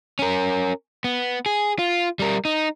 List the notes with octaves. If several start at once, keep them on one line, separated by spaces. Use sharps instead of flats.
C#4 A#4
B3
G#4
F4
G3 A#4
D#4